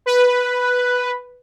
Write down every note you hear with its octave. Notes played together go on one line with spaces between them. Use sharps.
B4